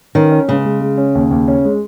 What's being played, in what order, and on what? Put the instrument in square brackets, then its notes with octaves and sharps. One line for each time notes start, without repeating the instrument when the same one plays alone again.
[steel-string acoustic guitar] D#3 [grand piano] C#4
[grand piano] C#4
[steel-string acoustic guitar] C#3 [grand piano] G#3
[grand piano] G#3
G#3
C#4
D#2
D#2
C#4
G#3